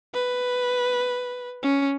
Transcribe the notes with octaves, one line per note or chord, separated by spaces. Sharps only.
B4
C#4